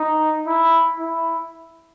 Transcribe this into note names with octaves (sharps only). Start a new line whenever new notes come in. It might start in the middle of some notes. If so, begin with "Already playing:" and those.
Already playing: D#4
E4
E4